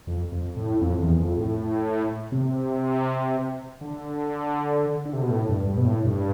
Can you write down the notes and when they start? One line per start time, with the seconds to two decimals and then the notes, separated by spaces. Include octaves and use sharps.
0.07 F2
0.32 F2
0.57 A2
0.81 F2
1.00 E2
1.20 F2
1.37 A2
2.32 C3
3.81 D3
5.05 D3
5.13 C3
5.22 B2
5.30 A2
5.49 G2
5.67 G2
5.77 B2
5.86 A2
6.05 G2